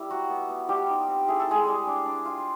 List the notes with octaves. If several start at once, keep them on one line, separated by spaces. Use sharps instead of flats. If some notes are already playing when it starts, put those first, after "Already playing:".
Already playing: G3 E4
F#3 F#4
B3
B3
F3 G3 G4
D#4
C4
E4 G#4
A4
G#3 E4 G#4
G3
D4
D4
F4